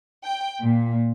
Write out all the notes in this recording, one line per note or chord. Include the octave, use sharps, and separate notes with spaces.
G5
A#2